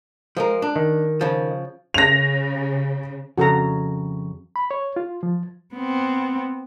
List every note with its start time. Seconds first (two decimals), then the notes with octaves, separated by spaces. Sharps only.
0.37 F3 G#3 A#4
0.62 D4
0.76 D#3
1.21 C#3 F3
1.94 C#3 A#6 F7
3.38 F2 C#3 F#4 A4 A#5
4.56 B5
4.71 C#5
4.96 F4
5.23 F3
5.75 B3 C4